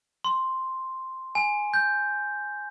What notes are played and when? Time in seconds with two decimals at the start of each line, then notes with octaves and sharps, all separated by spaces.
0.24 C6
1.35 G#5
1.74 G6